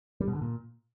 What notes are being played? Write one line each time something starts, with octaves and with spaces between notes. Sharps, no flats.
G3
B2
D3
A#2